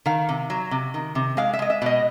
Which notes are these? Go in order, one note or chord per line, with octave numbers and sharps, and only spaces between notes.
D#3 F5
C3
F#3
C3
D#3
C3
G#3 F5
E5
G#3 D#5
E5
B2 D#5